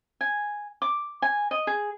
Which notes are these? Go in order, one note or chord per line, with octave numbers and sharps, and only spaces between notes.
G#5
D6
G#5
D#5
G#4